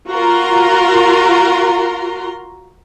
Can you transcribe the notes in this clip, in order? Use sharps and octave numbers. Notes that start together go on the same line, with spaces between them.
F4 F#4 A#4 A#5 C6